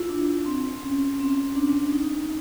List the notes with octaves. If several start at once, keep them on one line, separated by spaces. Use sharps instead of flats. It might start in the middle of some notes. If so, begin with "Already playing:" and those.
Already playing: E4 F4
D4
C4
C#4
C4
D4
D#4